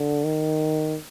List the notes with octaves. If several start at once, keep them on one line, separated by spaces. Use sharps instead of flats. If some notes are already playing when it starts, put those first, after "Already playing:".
Already playing: D3
D#3